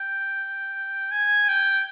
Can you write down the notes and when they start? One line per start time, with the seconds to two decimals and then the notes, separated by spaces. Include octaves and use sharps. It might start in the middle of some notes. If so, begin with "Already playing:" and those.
Already playing: G5
1.12 G#5
1.48 G5